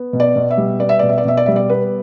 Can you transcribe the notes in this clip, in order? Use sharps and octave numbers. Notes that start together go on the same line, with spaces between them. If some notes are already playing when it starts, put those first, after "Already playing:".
Already playing: B3
B2
D5
B2
E5
G3
B3 D5
E5
B2 D5
E5
D5
B2 E5
D5
G3 E5
D5
B3 B4